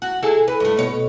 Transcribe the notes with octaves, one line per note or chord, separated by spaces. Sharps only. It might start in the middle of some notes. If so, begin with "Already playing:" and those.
F#4
E4 G#4 A4
B4
G2 A3
B2 C#5